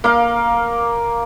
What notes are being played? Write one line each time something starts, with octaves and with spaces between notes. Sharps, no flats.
A#3 F5